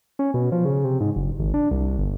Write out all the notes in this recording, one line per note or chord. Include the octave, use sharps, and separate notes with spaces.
C#4
B2
F3
C#3
C3
G#2
F#1
G#1
D4
C2
G1